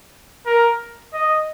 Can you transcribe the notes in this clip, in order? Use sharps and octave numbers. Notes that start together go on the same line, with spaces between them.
A#4
D#5